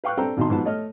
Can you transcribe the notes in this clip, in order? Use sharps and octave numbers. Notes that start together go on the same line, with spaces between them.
B4 F5 G5 C#6 F6 F#6
C4 D4 A4 G5 A#5
G#1 B2 D#3 D#4 A5 C6
G#2 F3 F#3 B3 A5
A3 C#5 D#5 F6